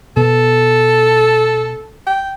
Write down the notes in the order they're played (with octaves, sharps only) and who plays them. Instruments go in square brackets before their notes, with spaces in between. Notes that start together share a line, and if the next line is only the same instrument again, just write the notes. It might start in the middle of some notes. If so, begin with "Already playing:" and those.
[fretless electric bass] B2 B3 [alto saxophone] A4
[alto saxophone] G5